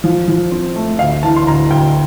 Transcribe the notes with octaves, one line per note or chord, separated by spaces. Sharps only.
F3
F3
C4
A3
D2 F5
E3 A5
C6
D2 A#5
D2 G5